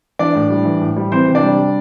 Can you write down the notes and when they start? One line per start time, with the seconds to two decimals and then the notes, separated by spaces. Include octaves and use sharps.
0.19 E3 D4 D5
0.35 A2
0.50 G3
0.65 E3
0.81 A2
0.96 G3
1.12 E3 C4 C5
1.28 C3
1.35 D4 D5
1.43 G3
1.59 G3